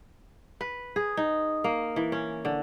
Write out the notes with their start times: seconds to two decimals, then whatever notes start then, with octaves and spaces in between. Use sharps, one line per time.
0.61 B4
0.96 G#4
1.17 D#4
1.64 A#3
1.96 E3
2.12 C#4
2.45 D3